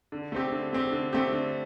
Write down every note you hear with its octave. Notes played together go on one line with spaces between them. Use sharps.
D3
A3 C4 G4
D3
A3 C4 G4
D3
A3 C4 G4
D3